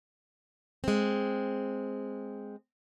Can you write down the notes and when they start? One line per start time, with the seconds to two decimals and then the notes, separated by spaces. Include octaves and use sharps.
0.84 G#3 C4